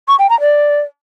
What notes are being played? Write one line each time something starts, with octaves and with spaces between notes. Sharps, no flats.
C#6
G5
A#5
D5